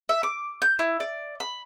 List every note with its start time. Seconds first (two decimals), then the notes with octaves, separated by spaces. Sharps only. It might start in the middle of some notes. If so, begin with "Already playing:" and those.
0.09 E5
0.23 D6
0.62 G6
0.79 E4
1.00 D5
1.40 B5